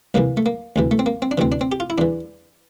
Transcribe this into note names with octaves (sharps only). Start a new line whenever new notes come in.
C2 C3 E3 A#3
A3
A#3
D2 C3 E3
A3
C4
A#3
C4
D4
D2 C3 E3 C4
D4
C4
G4
F4
E4
E2 E3 D4